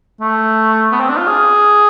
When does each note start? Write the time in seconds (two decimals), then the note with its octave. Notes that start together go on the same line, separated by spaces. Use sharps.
0.20 A3
0.92 B3
1.00 C4
1.09 D4
1.17 F4
1.27 G#4